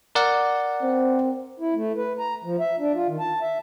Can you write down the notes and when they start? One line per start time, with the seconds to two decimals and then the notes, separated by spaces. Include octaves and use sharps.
0.15 A#4 D5 F#5
0.82 C4
1.60 E4
1.75 A3
1.97 B4
2.19 A#5
2.44 F3
2.60 E5
2.79 D4
2.94 F4
3.08 D#3
3.19 A5
3.41 E5